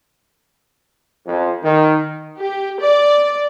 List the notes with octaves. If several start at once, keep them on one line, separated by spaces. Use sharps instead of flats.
F2
D#3
G4
D5